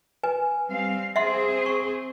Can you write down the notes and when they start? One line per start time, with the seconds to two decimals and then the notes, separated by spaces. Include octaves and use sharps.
0.23 B4 G#5
0.68 G3 C4 F5
1.16 C4 G#4 C5 E5 F#5 C6
1.66 C#6